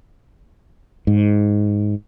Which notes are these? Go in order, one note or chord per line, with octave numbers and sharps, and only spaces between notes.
G#2